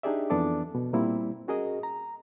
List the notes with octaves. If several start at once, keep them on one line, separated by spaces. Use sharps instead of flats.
D4 D#4 G4 G#4 D5 E5
F2 E3 B3 D4 A4 D6
B2
A#2 G3 A#3 C4 E4
C#4 F#4 G#4 A#4 D#5
A#5